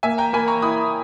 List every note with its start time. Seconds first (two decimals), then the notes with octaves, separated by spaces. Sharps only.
0.03 A#3 E5 G#5
0.18 G5 A#5
0.33 A#3 G#5 B5
0.48 A#5 C#6
0.62 E4 B5 D#6